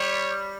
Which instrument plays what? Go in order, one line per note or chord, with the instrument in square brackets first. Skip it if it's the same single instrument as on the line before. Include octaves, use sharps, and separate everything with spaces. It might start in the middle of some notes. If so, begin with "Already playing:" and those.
Already playing: [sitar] G3 [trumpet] C#5